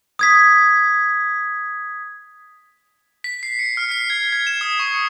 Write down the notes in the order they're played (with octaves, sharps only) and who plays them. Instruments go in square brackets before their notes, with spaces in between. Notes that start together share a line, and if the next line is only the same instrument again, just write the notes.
[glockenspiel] D#6 G#6 B6
[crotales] B6
C7
C#7
F6
C7
G#6
G#6
E7
D#6
C#6
C#7